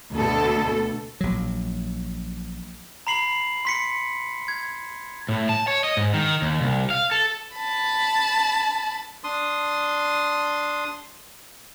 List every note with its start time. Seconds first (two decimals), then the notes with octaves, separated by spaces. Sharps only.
0.12 D2 B2 A4
1.21 A#1 F#3
3.07 A#5 B5 C7 F#7
3.65 C6 B6 C#7
4.48 G#6
5.29 A2
5.49 A5
5.68 C#5
5.84 D#5
5.97 G#2
6.14 D#3
6.42 D#2
6.61 C2
6.90 F5
7.11 A4
7.57 A5 B5
9.24 D4 C6 D#6